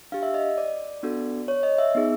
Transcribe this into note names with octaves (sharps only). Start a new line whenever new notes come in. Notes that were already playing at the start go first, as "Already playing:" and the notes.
D4 G4 F5
E5
D#5
D5
B3 D4 F#4 A4
C#5
D#5
E5
B3 D#4 G#4